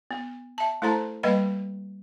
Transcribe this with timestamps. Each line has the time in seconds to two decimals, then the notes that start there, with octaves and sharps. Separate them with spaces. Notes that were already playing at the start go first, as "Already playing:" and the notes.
0.11 B3
0.58 E5 A5
0.82 A3 E4 A4 C5 A5 A#5
1.23 G3 A#3 B4 D#5 F5 B5